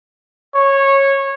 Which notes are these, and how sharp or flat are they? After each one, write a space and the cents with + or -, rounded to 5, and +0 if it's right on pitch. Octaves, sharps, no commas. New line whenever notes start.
C#5 -15